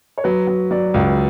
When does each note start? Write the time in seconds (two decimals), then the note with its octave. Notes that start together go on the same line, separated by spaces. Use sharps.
0.18 C#5
0.24 F#3 B4
0.47 F#3
0.71 F#3 D5
0.94 C#2